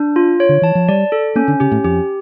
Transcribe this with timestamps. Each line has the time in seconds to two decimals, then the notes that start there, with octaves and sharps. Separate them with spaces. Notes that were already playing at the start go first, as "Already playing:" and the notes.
Already playing: D4
0.16 F4
0.40 C#5
0.49 D3
0.62 E3 A5
0.75 F3
0.88 G3 D5
1.12 A4
1.35 A#3 C#4
1.48 D3
1.60 C#3 G4
1.71 A2
1.84 F2 G4